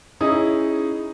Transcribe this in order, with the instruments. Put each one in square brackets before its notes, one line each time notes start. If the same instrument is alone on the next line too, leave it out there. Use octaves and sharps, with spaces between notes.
[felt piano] C#4 D#4 E4 G#4